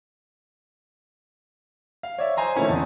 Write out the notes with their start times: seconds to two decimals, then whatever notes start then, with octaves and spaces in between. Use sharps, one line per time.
2.03 F5
2.18 C#5 D5 E5
2.37 C5 D#5 G#5 A#5 C6
2.56 D#3 F3 A3 A#3 C#4 E4
2.69 E2 C4 A5